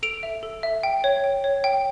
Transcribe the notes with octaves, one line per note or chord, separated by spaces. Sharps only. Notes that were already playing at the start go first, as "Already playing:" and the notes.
A4 D7 F7
E5
A4
E5
G5
C#5
G5
C#5
G5